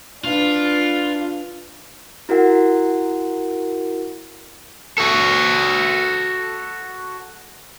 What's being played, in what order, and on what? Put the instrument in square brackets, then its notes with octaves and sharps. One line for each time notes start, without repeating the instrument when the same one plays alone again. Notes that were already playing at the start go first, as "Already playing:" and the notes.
[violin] D4 B4 [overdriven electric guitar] F4
[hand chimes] E4 F#4 A#4 F#5
[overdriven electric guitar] F#4 A4